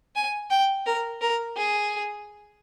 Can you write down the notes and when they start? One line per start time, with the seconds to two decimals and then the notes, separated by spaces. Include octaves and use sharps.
0.16 G#5
0.51 G5
0.86 A#4
1.21 A#4
1.57 G#4